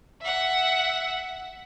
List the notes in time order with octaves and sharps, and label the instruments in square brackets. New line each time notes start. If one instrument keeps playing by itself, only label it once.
[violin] E5 F#5